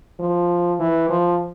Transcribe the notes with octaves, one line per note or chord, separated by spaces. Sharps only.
F3
E3
F3